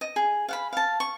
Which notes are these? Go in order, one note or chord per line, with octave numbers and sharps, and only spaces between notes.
D#5
G#4
F5 F#5 B5
F5 A5
C#6